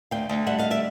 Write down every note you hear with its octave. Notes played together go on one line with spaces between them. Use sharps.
D2 F5 G5
D2
G3 E5 F#5
D#5 F5
D5 E5